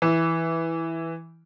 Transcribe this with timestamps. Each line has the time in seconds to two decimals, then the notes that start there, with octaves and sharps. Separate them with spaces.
0.02 E3